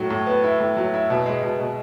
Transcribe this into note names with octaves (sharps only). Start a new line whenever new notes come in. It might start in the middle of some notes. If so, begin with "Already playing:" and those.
Already playing: A2 F#3
A2
B3
E4
A2
F#3
E4
B2
G#3
B2
B2